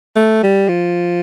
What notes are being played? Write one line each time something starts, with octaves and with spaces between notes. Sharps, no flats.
A3
G3
F3